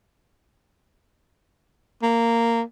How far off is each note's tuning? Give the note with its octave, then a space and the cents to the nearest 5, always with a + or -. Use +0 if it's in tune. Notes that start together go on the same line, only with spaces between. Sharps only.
A#3 -10